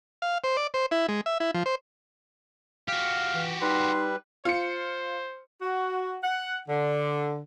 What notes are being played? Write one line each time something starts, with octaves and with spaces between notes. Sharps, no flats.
F5
C5
D5
C5
E4
G#3
E5
E4
F3
C5
F#4 G4 F5
E3
G3 D#4 B4 C6
F4 C5 C#7
F#4
F#5
D3